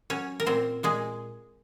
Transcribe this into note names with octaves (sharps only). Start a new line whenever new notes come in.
F#3 C#4 C#5
A#4
A#2 C4 C5
A#2 G#3 G#4